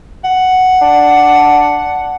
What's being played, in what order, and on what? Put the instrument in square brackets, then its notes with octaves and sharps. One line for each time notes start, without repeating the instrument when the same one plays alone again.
[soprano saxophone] F#5
[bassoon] D4